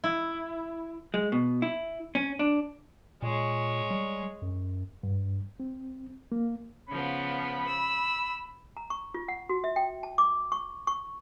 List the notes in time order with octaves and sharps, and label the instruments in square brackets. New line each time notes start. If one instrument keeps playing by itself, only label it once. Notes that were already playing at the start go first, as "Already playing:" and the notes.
[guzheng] E4
[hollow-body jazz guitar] G#3
B2
E4
C#4
D4
[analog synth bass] A#2 [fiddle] G#3 C#5
[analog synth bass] G3
F#2
[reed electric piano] G2
C4
A#3
[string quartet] C#3 F3 B3 [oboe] B5
[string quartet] E6
[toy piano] A#5
C#6
F4
F#5
F#4
E5
G5
A5
D6
C#6
C#6